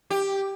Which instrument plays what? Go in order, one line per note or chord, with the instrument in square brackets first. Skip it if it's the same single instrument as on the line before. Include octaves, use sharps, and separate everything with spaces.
[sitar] G4